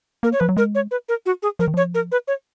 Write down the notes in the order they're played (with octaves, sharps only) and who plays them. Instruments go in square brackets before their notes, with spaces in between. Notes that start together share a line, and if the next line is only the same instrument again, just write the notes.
[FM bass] A#3 [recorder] A#4
[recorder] C#5
[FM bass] F3 [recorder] B4
[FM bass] F#3
[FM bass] G#3 [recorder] A#4
[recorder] C#5
B4
A#4
F#4
G#4
[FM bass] F3 [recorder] A#4
[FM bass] D#3
[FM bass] F3 [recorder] C#5
[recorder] A#4
B4
C#5